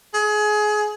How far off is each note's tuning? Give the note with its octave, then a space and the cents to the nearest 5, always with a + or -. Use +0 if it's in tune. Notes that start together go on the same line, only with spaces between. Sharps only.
G#4 +25